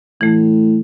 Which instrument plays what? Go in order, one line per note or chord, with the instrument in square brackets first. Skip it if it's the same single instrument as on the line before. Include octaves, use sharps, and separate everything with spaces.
[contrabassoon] A2 [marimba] E3 A3